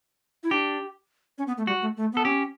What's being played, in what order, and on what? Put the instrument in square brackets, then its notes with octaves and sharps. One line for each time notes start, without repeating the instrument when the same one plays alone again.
[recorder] E4
[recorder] D4 [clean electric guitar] G4
[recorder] C#4
B3
A3
[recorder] G3 [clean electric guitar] F#4
[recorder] A3
A3
[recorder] B3 [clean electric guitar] A4
[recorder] C#4 [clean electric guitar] G4